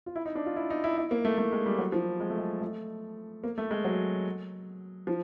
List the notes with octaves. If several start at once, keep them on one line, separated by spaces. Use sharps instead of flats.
F4
E4
D#4
D4
F4
E4
D#4
E4
E4
A#3
A3
A3
G#3
G3
F#3
F3
G#3
A3
G#3
A3
A#3
A3
G#3
F#3
F3